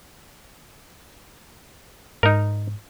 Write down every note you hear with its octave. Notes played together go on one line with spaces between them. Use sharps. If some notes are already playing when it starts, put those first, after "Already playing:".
G#2 D#4 A#4